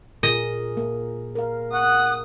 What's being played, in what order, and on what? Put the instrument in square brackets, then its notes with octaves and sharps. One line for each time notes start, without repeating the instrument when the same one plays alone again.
[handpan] A#2 G#4 A#4 [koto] D#5
[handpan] A#3
A#4 F5
[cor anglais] F#5 [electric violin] D#6